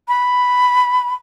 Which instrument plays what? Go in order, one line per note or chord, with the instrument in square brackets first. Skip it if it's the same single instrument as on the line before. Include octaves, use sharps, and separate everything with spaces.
[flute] B5